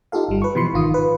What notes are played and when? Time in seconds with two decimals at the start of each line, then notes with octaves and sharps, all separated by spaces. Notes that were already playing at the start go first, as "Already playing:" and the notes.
0.12 D#4 F4 G4 A4 F5
0.29 G1 G3
0.42 B4 C#6
0.55 B2 E3 F3 B5 C6 C#7
0.73 G#1 D#3 F4 D#6
0.94 B4